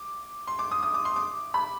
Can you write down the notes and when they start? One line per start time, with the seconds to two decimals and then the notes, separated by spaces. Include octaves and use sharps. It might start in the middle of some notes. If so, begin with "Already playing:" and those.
Already playing: D6
0.47 C6
0.59 D6
0.71 D#6
0.83 D#6
0.94 D6
1.05 C6
1.16 D6
1.54 B5